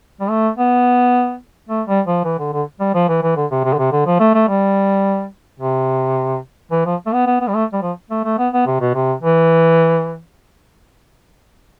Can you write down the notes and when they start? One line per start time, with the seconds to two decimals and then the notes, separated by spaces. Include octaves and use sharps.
0.21 G3
0.30 A3
0.58 B3
1.69 A3
1.88 G3
2.07 F3
2.24 E3
2.39 D3
2.53 D3
2.80 G3
2.95 F3
3.09 E3
3.23 E3
3.36 D3
3.51 C3
3.64 C3
3.73 D3
3.78 C3
3.92 D3
4.06 F3
4.20 A3
4.34 A3
4.48 G3
5.60 C3
6.71 E3
6.86 F3
7.07 A3
7.13 B3
7.27 B3
7.41 B3
7.48 G3
7.55 A3
7.73 G3
7.82 F3
8.11 A3
8.25 A3
8.39 B3
8.53 B3
8.67 C3
8.81 B2
8.95 C3
9.22 E3